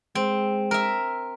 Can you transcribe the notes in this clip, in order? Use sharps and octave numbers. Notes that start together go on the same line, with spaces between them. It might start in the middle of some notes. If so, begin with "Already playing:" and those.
G#3 C4
A#4 E5